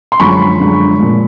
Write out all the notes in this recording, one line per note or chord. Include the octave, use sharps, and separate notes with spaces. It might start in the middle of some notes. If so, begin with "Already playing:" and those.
C6
F#2 D3 F3 G#3 B5 C#6
F#2 D3 F3 G#3
A#2 F3 G#3